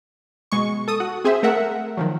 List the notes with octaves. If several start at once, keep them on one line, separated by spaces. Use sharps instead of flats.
B2 G#3 C#6
A4 D#6
F#4
C4 G#4 C5 E5
A3 A#4 E5 F#5
D#3 F3 F#3